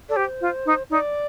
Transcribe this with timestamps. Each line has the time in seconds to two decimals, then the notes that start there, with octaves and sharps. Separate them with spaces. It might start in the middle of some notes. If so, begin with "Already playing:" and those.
0.09 A4 D5
0.16 G4 C5
0.41 F4
0.66 D#4
0.90 D#4 D5